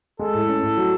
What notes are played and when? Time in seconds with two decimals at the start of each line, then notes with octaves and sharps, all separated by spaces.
0.19 G#3 A4
0.34 A2
0.48 C#4
0.63 A2
0.77 F#3